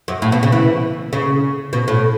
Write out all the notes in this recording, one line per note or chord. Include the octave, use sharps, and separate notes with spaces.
F#2
A2
B2
C#3
E3
C#3
B2
A2